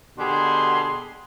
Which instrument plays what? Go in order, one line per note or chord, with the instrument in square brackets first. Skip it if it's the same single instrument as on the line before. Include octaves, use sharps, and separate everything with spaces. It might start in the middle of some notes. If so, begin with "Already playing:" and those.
[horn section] B2 D3 D4 G4 G#4 C6